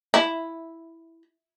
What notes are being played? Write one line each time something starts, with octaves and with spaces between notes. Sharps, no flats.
E4